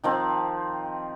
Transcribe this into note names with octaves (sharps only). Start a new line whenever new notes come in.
D#3 F3 C4